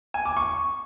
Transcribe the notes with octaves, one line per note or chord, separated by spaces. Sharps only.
G#5
D6
C#6